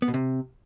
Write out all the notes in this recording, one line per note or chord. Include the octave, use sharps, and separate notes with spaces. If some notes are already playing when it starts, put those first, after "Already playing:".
B3
B2
C3